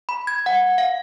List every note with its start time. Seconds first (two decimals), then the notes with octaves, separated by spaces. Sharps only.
0.09 B5
0.27 G#6
0.46 F#5
0.78 F5